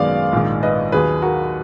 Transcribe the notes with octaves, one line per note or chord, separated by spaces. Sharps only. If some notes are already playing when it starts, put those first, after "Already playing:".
Already playing: G#1 F#2 D#3 G#3 B3 D5 F5
A#1 G#2 D#3
B4 D#5
D#2 D#3 F#3 G#4 B4
F#4 A#4